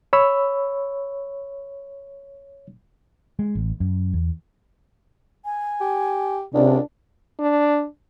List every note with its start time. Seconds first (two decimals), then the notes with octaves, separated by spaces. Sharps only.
0.13 C#5 B5 E6
3.39 G#3
3.55 A1
3.80 F#2
4.13 E2
5.45 G#5
5.81 G4
6.54 C#2 C3 D4
7.39 D4